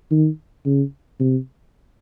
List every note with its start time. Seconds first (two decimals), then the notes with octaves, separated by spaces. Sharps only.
0.11 D#3
0.65 C#3
1.20 C3